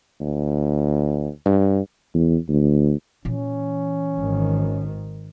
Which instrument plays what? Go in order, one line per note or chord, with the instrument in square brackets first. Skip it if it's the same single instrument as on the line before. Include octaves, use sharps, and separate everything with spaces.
[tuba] D2
G2
E2
D2
[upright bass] A#2 E3 [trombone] C#4
[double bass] G#1 D#3